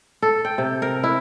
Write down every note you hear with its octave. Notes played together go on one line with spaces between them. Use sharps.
A4
G5
C3
A#4
E4